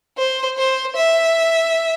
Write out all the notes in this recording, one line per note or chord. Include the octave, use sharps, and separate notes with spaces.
C5
C5
E5